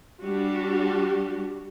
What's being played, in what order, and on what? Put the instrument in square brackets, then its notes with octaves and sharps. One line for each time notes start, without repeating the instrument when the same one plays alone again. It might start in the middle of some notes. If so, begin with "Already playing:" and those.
[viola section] G3 D4 F#4 G4